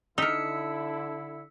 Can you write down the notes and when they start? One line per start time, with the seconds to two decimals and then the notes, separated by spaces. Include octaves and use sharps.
0.18 D3 D#4 E4 A#4 E6 B6 C#7